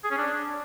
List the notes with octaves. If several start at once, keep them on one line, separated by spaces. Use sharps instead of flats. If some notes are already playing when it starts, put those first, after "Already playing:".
G#4
C#4
D4